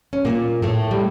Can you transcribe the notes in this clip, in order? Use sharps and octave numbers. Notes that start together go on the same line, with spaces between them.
C#4
A#2 A#3
A2 A3
G3